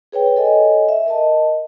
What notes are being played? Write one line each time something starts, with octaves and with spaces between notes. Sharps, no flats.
G#4 B4 C#5 G5
A4 C#5 D#5 G#5
E5
A#4 D#5 A5